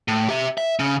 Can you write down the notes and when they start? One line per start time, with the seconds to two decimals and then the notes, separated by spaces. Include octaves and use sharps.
0.08 A2
0.29 G4 E5
0.58 E5
0.79 C#3 C#4